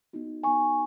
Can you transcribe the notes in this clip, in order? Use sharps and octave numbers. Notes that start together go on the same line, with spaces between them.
B3 D#4 F#4
B3 D#4 F#4 G#5 C#6